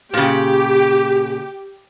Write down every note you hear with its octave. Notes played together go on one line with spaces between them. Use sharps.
A#2 C#3 G4